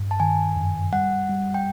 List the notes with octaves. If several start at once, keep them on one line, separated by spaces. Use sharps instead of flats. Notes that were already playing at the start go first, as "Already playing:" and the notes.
Already playing: G2
A5
D#3 G#5
F#2
G3 F#5
G3
G5